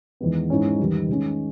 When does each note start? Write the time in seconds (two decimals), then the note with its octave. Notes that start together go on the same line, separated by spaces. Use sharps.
0.20 E2 D#3 G#3 B3
0.50 G#2 E3 G#3 C#4
0.79 E2 D#3 G3
1.09 D#3 G#3 C#4